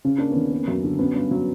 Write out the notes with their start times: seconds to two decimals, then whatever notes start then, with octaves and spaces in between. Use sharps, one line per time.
0.04 C#3 C#4
0.18 A#3 D4
0.31 D#2 B3 C#4
0.52 A#3
0.68 F#2
0.84 D3
0.99 F#3 B3 C#4
1.14 G2
1.31 F#3